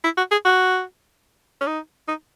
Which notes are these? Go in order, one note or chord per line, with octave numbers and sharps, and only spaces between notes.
E4
F#4
G#4
F#4
C#4
D#4
D#4